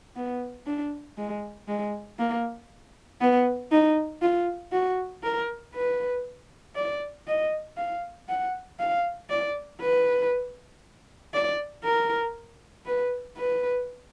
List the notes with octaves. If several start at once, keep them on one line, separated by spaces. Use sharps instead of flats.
B3
D4
G#3
G#3
A#3
B3
D#4
F4
F#4
A#4
B4
D5
D#5
F5
F#5
F5
D5
B4
D5
A#4
B4
B4